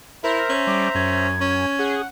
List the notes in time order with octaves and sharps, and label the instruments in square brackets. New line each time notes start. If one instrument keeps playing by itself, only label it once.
[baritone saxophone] E4 [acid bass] A#4 [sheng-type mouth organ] C5 E5 A#5
[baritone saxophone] C#4
[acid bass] G3 [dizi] D6
[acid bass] F#2 [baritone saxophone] C#4 [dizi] G#6
[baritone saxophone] C#4
[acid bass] G#4 [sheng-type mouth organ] F#5